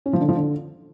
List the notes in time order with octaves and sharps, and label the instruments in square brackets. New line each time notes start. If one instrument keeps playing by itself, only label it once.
[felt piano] C#4
F3
D3
F3
D3